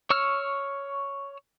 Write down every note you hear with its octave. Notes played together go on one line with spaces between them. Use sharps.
C#5 C#6 E6 F6